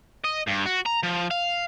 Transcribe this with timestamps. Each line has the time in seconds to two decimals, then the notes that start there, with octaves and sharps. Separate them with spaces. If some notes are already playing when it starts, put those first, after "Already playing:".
0.24 D#5
0.47 G2
0.65 F#4
0.86 A#5
1.03 F3
1.31 F5